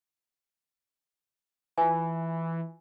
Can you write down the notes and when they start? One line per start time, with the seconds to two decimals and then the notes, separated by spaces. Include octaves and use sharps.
1.78 E3 F4 G#5